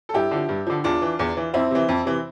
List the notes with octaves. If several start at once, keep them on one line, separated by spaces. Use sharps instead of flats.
A4
G2 E4 G4
D3 F3
G2
D3 F3
E2 D4 F4
E3
E2
E3
F2 C4 E4
C3 E3
F2
C3 E3